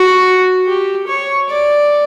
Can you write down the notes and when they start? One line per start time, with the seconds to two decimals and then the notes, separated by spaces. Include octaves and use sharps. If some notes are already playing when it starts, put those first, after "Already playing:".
Already playing: F#4
0.66 G4
1.07 C#5
1.49 D5